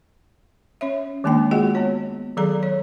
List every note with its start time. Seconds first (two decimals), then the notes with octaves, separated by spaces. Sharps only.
0.81 C#4 C#5 E5
1.24 D#3 G#3 A#3 D4 G5
1.51 G#3 F4 F#4 G#4 D#5 F#5
1.75 B3 C#5
2.37 D#3 F#3 G#4 A4 D5 A#5
2.63 C#5